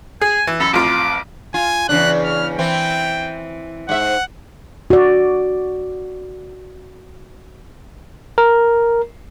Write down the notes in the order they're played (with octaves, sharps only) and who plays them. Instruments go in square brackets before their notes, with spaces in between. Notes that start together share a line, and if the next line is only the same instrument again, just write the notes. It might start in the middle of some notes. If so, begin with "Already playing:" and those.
[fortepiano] G#4 [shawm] G#5
[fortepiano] E3
[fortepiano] F#2 B5 [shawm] A4
[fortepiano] A1 F2 F4 [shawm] D6
[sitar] F4 [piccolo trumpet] G#5
[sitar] E2 C#3 D4 [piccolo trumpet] F#6
[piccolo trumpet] F6
[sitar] E3 C4 E4 [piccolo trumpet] G5
[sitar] G#2 E5 [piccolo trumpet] F#5
[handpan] F#4 D5
[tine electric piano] A#4